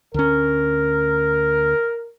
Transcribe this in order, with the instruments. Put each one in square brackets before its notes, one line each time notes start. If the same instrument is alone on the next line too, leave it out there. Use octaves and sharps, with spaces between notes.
[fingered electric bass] D2 C#4 [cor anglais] A#4